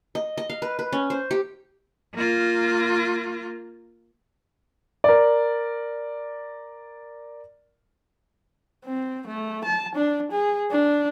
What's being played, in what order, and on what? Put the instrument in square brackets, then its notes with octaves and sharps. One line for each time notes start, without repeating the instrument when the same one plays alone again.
[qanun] D#5
D#5
F5
B4
B4
C#4
C5
G4
[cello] A#3 F4
[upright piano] A#4 D5
[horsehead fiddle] C4
A3
A5
D4
G#4
D4